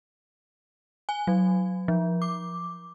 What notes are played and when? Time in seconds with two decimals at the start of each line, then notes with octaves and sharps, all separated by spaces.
1.09 G#5
1.27 F#3
1.88 F3
2.22 D6